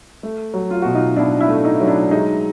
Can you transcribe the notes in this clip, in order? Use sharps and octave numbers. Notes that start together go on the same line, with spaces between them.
A3
F#3
F4
B2 F#4
D#4 F4
B2 D4 E4
D4 E4
A3
D#4
F#3
D4 E4
G#3 D#4